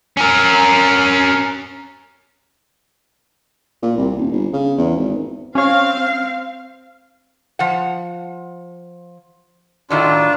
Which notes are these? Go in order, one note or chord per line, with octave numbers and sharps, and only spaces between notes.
C#4 A#4
A#2
C2
D#1
G1
C#3
E2
G#1
C4 C#4 C#5 F5
F3 F#5
A2 D#3 F#3 D4 F4